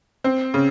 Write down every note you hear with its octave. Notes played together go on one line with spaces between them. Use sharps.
C4
C#3